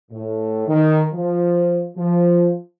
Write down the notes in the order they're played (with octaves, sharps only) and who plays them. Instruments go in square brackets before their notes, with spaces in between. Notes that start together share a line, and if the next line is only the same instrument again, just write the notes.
[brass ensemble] A2
D#3
F3
F3